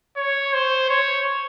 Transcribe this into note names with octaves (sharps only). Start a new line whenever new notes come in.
C#5
C5
C#5